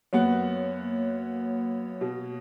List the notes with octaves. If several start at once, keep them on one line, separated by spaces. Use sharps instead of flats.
F#2 A#3 B3 C#5 F#5
B2